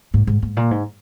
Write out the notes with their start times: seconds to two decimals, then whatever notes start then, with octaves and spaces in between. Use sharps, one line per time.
0.14 G#2
0.27 G#2
0.42 G#2
0.57 A#2
0.71 G#2